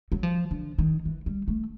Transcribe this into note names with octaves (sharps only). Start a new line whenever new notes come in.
F#3
F3
D3
D#3
E3
G3
A3